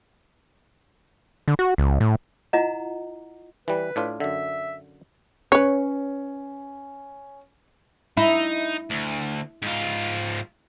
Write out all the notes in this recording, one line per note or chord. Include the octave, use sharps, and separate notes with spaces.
D3
F#4
C#2
A2
E4 F4 D#5 F#5 A#5
E3 G3 B4
A2 D4 F4
F#2 D3 E5
C#4 B4 C#5
D#4 E4
D2
G#2 F4